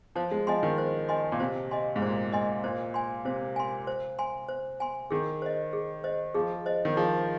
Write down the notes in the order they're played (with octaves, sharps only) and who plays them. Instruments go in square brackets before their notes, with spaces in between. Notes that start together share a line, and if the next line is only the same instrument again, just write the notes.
[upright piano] F3 [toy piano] C5
[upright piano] G#3
[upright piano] F3 [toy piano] D#5 G#5 C6
[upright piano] D#3
[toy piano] C5
D#5 G#5 C6
[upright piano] A#2
[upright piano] C3 [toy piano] C5
[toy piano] D#5 G#5 C6
[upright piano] G#2
[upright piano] A#2 [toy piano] C5
[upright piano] G#2 [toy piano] D#5 G#5 C6
[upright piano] A#2 [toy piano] C5
[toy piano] G#5 C6
[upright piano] C3 [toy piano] C5
[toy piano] G#5 C6
C5
G#5 C6
C5
G#5 C6
[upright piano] D#3 [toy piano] G#4
[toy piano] C5 D#5
G#4
C5 D#5
[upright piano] F3 [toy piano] G#4
[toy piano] C5 D#5
[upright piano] D#3
[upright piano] F3 [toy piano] G#4